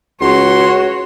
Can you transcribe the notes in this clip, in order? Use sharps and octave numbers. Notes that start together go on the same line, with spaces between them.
C#2 F#4 C#5 C6